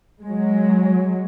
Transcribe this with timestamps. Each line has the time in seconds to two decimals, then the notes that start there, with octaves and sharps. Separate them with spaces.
0.24 F#3 G#3